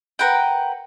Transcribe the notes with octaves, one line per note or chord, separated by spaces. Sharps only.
A#4 B4 F#5 G5